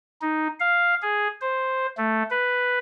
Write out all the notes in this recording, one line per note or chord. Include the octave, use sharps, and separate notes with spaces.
D#4
F5
G#4
C5
A3
B4